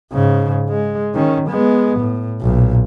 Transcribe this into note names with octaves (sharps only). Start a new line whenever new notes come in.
G#2 C#3
G#3
D#3 C#4
G#3 B3
A2
B1 A#2